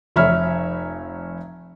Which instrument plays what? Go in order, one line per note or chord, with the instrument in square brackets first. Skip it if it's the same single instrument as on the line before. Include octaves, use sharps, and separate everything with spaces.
[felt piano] F1 C#5 E5 B5 F6